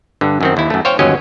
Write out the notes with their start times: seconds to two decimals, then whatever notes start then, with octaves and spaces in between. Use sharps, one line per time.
0.21 G2 D3
0.41 F#2 D#3 C4
0.57 D#2 E4
0.70 F#2 A3
0.85 C5 C#5 F5 G5
0.99 G1 D#2 F#3 C#4 D#5